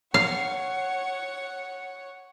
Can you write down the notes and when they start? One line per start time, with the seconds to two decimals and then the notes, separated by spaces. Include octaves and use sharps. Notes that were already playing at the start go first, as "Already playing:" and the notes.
0.14 C#5 F5 F#5